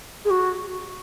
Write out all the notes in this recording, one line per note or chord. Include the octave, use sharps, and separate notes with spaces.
G#4
F#4